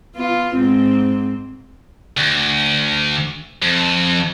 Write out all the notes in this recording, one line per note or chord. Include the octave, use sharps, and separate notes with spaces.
B3 F4
G#2 C4
D2
F2